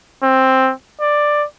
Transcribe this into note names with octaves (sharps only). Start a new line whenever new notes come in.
C4
D5